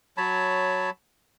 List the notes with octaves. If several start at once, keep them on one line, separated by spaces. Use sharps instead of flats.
F#3 C#5 A5 B5